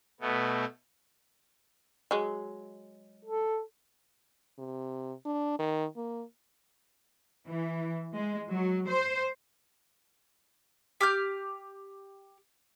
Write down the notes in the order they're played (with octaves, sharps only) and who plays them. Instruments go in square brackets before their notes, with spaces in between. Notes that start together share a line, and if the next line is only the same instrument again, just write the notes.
[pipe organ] B2 A3 B3
[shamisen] F#3 G#3
[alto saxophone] A4
[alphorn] C3
D4
D#3
A#3
[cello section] E3
G#3
F#3
C5
[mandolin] G4 D6 F6 G6